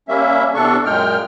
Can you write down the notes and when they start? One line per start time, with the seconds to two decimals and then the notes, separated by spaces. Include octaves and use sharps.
0.09 G3 A#3 C#4 E5
0.54 E2 C3 D4 A4 C#6
0.85 F#2 A#2 G#3 G5 F6